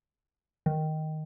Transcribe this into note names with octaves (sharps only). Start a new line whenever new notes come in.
D#3